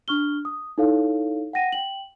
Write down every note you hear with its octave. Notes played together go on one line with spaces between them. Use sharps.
D4 C#6 F6 G7
D#6
D#4 E4 A4 C#5 F5
F#5 G5 A#6 D#7
G5 F#7